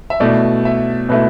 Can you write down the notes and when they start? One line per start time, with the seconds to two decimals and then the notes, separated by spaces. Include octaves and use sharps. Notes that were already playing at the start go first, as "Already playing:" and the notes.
0.10 E5
0.20 B2 A3 E4 D5
0.65 E5
1.09 B2 A3 E4 B4